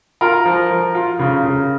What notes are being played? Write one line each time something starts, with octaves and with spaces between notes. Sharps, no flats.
F4 A#4
F3
F3
F4
C#3
C#3